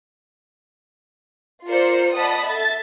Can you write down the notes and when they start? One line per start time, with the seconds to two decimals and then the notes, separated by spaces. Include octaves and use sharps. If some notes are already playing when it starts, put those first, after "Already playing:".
1.65 F4 A#4 C5 D5 C#7
2.14 D5 D#5 F#5 A5 B5 D#6
2.44 A4 E5 A6